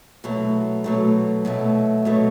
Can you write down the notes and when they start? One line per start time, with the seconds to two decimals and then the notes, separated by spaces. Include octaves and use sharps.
0.24 B2 F#3 A3
0.84 B2 F#3 A3
1.45 B2 F#3 A3
2.05 B2 F#3 A3